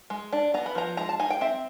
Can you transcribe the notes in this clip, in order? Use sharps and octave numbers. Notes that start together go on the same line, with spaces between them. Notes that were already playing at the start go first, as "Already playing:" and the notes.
G#3
D4
B3 A#5
B5
F3 A#5
G#3 A#5
A5
D#4 G#5
G5
C4 E5